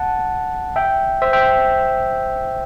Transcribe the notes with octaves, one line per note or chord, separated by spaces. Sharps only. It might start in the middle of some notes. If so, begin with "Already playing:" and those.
Already playing: F#5 A5
E5 G5
C5 E5
E5 G5